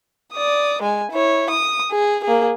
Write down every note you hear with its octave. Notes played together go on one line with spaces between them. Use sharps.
D5 D#6
G#3 G#5
E4 C#5
D#6
G#4
A#3 G#4